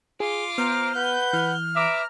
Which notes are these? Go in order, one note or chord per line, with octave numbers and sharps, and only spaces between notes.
F4 G#4 D6
B3 C5 A#5 F6
B4 F#5 G6
E3 F6
B4 E5 A#5 D6